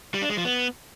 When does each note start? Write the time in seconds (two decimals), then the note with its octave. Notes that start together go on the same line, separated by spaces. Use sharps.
0.14 G3
0.22 D4
0.30 G#3
0.37 F3
0.45 B3